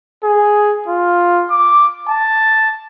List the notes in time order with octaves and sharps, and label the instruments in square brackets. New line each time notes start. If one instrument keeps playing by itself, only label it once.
[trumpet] G#4
F4
D6
A5